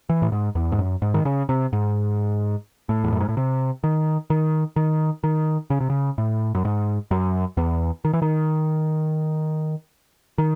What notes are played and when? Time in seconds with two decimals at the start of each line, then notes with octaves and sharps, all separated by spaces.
0.09 E3
0.22 A2
0.32 G#2
0.55 E2
0.72 G#2
0.78 F#2
1.02 G#2
1.14 D#3
1.25 C#3
1.49 C3
1.73 G#2
2.89 A2
3.04 E2
3.12 F#2
3.20 G#2
3.29 A2
3.37 C3
3.84 D#3
4.30 D#3
4.76 D#3
5.24 D#3
5.70 C#3
5.81 C3
5.90 C#3
6.18 A2
6.55 F#2
6.65 G#2
7.11 F#2
7.57 E2
8.05 D#3
8.13 E3
8.22 D#3
10.38 D#3